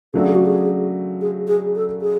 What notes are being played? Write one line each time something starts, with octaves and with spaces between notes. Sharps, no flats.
C#3 F#3 A3 D4 A4
G#4
F#4
G#4
G#4
G#4
A4
G#4